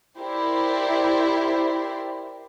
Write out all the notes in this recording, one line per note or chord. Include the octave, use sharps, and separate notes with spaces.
E4 G4 A#4 C5 D5